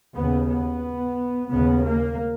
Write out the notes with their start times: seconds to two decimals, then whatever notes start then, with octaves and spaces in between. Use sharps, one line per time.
0.14 D#2 C#3 B3
0.48 B3
1.49 D#2 C#3 B3
1.82 A#3